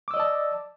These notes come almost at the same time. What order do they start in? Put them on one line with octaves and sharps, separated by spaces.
D6 E6 D#5 D5 A5